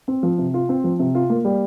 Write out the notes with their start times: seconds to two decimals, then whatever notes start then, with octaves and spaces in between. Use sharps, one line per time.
0.08 C4
0.23 F3
0.38 C3
0.54 F4
0.69 C4
0.84 F3
0.99 C3
1.15 F4
1.30 A#3
1.45 G3